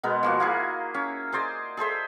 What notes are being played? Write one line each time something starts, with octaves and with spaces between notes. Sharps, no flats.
B2 G#3 B3 A#4
F3 A#3 F#4
A#3 E4 G#4
C#4
G#4 C5 D5 D#5
G#4 A4 C5 E5